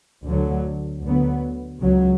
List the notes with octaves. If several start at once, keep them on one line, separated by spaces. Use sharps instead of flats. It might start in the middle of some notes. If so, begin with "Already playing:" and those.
D2 D3 F#3
D2 D3 F#3 B3
C#2 C#3 F#3